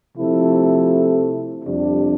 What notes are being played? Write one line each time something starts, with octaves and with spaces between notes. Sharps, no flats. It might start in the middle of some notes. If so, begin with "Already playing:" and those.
C3 F3 A3 E4 A4
F2 C3 G3 D4